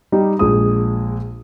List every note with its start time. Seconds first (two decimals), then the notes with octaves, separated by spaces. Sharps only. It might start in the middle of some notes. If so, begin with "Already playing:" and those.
0.12 G3 D#4 G4
0.39 A#1 G#3 D#6